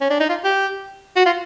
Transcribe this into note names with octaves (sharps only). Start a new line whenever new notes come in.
C#4
D4
D#4
F4
G4
F#4
F4